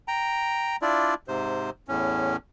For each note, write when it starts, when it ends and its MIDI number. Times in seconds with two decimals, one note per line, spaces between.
0.08 0.76 79
0.08 0.76 82
0.82 1.14 62
0.82 1.14 64
0.82 1.14 65
0.82 1.14 74
1.28 1.70 44
1.28 1.70 48
1.28 1.70 72
1.88 2.36 40
1.88 2.36 45
1.88 2.36 61